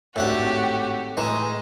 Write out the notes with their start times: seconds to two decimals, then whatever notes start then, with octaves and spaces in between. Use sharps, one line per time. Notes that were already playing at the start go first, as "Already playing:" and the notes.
0.16 G#1 A2 A3 D4 F#4 G4 E5 F#5
1.17 A2 E3 G#3 D#5 A#5 E7